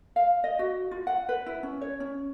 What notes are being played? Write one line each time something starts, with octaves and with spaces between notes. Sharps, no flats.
F5
D#5
F#4
F4
F#5
B4
E4
C#4
C#5
C#4